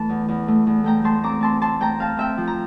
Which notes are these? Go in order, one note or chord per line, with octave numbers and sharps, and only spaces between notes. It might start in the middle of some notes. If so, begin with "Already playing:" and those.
Already playing: E3 A3 A5
E2
E2
A3
E2
A3 G5 A#5
A3 A5 C6
C4 A#5 D6
C4 A5 C6
C4 A5 C6
A3 G5 A#5
C4 F5 A5
C4 E5 G5
F3
A#5